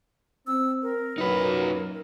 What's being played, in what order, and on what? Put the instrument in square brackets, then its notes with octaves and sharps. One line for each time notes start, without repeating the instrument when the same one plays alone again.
[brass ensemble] C4 [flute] E6
[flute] A#4
[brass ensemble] F#2 A#2 F#3 [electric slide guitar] D#4 B4